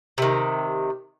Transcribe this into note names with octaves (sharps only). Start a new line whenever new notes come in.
C3 D#3